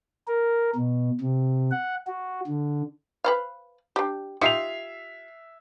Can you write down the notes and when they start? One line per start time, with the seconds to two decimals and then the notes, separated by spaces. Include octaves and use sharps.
0.28 A#4
0.76 B2
1.21 C3
1.71 F#5
2.07 F#4
2.47 D3
3.24 B4 C5 F5
3.96 D4 G4
4.41 D#4 F4 G4 E5 C7 F7